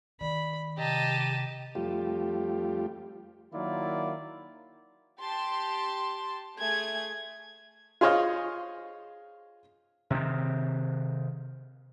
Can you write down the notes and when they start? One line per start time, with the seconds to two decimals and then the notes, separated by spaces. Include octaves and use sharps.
0.21 D#3 D5 B5
0.78 C3 G4 D#5 A5 A#5 D#7
1.75 F2 G3 A3 F4 G4
3.53 D#3 F#3 A#3 E4 F4 D5
5.20 G4 A5 C6
6.59 A3 G#4 G#6
8.01 F4 G#4 C5 C#5 D#5 F5
10.10 C3 D#3 C4